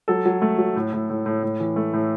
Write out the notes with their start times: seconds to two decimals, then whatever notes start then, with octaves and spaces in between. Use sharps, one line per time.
0.08 F#3 A4
0.26 F#3
0.42 A3
0.58 F#3
0.76 A2
0.93 A2
1.10 A2
1.26 A2
1.43 A2
1.60 E3
1.76 A3
1.93 A2